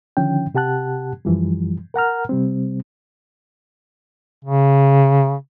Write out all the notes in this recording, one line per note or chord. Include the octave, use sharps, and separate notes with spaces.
D3 D#3 F3 C#4 G5
C3 G4 F#5 A5 F#6
F#2 E3 F3 G3
A#4 F#5 A#5 F6
C3 G3 C4
C#3